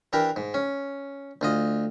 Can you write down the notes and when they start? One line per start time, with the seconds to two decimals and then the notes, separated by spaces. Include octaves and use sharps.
0.13 E3 D4 G4 A#4
0.36 G#2
0.54 C#4
1.41 D2 F4 D#5